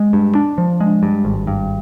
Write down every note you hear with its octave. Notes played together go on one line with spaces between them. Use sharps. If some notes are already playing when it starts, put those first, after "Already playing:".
Already playing: G#3
G2
D4
F3
G#3
G2
G#1
G2